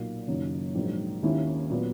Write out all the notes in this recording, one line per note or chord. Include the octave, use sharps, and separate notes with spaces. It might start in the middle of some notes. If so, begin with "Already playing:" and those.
Already playing: B1 A#2 A#3
F#1 F#2 D#3 A#3
A#1 G#2 F#3 A#3
D#2 D#3 A#3 C#4 E4
A#2 F#3 B3